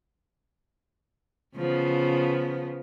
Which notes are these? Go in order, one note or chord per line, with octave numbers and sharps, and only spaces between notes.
C#3 F3 B3